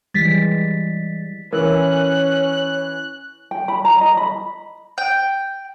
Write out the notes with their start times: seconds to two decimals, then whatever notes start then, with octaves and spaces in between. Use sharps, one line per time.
0.14 E3 G3 G#3 A6 B6
1.53 E3 C#4 A#4 F#6
3.51 G5
3.68 B5
3.85 A#5
4.01 D#5
4.17 B5
4.98 G5